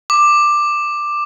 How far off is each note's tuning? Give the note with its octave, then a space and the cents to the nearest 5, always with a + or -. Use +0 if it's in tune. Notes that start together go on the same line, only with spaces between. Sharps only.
D6 +10